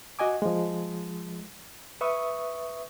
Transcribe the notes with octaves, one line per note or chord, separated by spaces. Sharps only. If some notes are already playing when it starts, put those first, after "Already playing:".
F#4 D#5 G#5 D6
F3 G#3
B4 E5 C#6 D#6